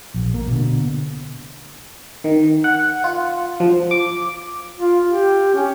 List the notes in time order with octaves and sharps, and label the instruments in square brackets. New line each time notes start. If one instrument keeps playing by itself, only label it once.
[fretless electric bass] A#1
A#3
B2 D3
[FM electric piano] D#3
F#5
F4
F3
D6
[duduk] F4
G4
C#4